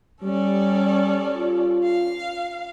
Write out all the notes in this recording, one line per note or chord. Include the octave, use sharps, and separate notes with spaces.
G3 C#4 A4 D5
F4
F5